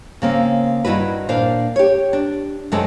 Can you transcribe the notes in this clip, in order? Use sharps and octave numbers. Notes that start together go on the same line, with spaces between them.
C#3 A#3 C4
G2 D#3 E4 F#4 B4
A#2 D4 A#4 C5 F5
G4 C#5
D4
F#2 C3 D#3 G#3 A3 A4